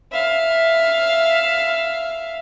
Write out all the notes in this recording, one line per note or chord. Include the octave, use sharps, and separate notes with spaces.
E5 F5